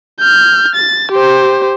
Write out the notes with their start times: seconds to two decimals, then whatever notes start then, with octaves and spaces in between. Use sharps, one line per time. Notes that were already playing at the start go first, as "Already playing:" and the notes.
0.20 F6 G6
0.75 A6
1.12 G4 C5